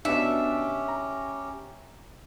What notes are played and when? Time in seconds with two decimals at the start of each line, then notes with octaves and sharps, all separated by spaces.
0.05 B2 B3 C#4 D4 G4 E5
0.88 A#5